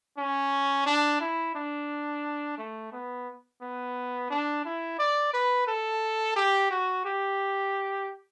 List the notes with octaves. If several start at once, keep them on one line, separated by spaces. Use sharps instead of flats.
C#4
D4
E4
D4
A3
B3
B3
D4
E4
D5
B4
A4
G4
F#4
G4